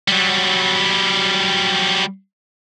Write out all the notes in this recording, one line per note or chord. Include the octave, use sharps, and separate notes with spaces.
F#3 G3